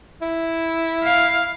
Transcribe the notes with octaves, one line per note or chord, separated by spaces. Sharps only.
E4
F5